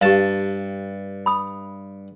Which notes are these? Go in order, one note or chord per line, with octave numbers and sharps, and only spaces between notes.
G2 G4 F5 A5
B5 D#6